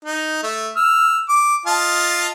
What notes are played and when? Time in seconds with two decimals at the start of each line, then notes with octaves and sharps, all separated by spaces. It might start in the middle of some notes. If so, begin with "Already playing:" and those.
0.05 D#4
0.43 A3
0.76 E6 F6
1.29 D6
1.66 F4 D#5 A5